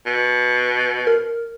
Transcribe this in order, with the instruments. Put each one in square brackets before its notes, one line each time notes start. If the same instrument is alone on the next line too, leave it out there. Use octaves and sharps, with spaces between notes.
[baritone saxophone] B2
[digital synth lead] A#4